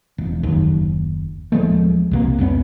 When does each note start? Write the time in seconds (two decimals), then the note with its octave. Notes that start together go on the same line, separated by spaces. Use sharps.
0.18 E1
0.43 F#1 D#2
1.52 D1 F3 G#3 A3
2.11 C2 C3 A#3
2.39 C2 F2 B3 C#4